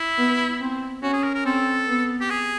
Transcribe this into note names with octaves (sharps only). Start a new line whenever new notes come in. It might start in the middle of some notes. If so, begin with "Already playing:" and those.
Already playing: E4
B3
C4
C#4 F#4
G#4
A#4
A#4
C4 A4
B3
G4
G#4